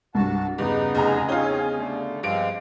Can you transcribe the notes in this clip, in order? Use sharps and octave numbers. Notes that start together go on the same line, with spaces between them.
C2 G2 F#4 A5
E2 G2 C#3 B3 D#4 G4
F1 G#4 A#5
C4 C#4 D#4 F4
D3 A3
G2 F3 G#3 C4 F5 D7